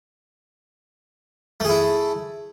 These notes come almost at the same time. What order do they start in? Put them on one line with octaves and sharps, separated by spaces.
A3 G#4 E4